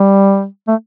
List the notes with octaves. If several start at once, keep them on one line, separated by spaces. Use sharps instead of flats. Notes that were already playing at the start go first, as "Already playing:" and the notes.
Already playing: G3
A3